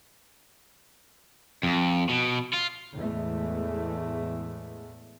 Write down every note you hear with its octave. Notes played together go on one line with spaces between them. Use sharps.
F2
B2
F4
E2 A2 G#3 A3